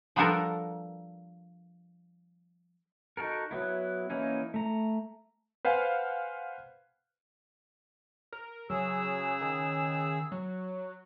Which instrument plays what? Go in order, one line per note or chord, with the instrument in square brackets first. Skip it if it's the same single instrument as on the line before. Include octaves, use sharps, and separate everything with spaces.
[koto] F3 G3 B3 D4 A4 A#4
[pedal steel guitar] D#4 F#4 A4 A#4
F#3 B3 E4
E3 A#3 C#4 D#4 E4
A3 A#5
[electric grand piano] B4 C5 F5 F#5 G#5
[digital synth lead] A#4
[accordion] C#3 G#4 E6 [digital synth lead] F#3
[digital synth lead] D#3
F#3